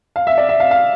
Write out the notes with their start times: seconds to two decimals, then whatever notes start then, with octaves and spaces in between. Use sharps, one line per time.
0.16 F5
0.27 E5
0.38 D5
0.49 E5
0.60 F5
0.71 F5